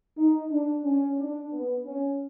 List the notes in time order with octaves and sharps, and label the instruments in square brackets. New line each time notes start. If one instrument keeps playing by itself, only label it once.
[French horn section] D#4
D4
C#4
D4
B3
C#4